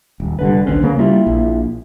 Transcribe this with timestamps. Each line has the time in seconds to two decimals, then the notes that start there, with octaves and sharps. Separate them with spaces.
0.20 D#1
0.39 F1 D3 G3 B4
0.67 A#1 D#2 C#4 D4 B4 C5
0.82 D2 C#3 A#3
0.98 G3 A#3 E4 F4
1.27 A#1